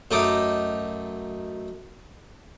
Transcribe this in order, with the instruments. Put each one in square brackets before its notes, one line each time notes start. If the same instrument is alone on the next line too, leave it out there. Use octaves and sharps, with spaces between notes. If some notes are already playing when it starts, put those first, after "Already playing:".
[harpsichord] F#2 A3 D#4 D#5 D6